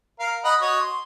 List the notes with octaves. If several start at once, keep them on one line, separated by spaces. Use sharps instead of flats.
A#4 F5
D#5 F#5 B5
F#4 C#5 D#5
C6